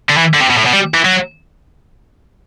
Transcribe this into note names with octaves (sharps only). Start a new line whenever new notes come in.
D3
E3
D3
C3
B2
A2
B2
G3
E3
F#3